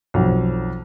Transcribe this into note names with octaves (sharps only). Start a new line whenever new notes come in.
B1 F2